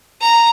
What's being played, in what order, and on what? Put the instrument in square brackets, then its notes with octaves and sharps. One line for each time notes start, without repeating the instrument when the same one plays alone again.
[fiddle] A#5